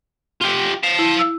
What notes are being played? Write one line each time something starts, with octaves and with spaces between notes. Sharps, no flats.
F4 G4
F5 A5
E4
E6